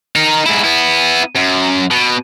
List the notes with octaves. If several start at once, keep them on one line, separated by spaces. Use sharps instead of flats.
D#4 A#4
G#2 E4
B3 E4
F#2
B2